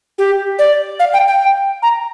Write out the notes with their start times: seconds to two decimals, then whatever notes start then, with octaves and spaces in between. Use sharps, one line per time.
0.18 G4
0.59 D5
1.00 F5
1.13 G5
1.28 G5
1.82 A#5